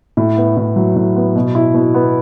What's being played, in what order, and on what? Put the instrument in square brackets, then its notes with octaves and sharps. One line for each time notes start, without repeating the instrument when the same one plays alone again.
[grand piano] A2
B3
A2
F#3
A2
B3
B2
E4
B2
B3